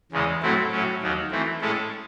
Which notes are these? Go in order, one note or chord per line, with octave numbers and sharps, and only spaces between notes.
E2 C#3 G#3
A2 F#3 A3 C4 E4
A2 F#3 C#4
D#2 D#3 F#3
E3 A3 C4
A2 G#3 C#4 E4 A4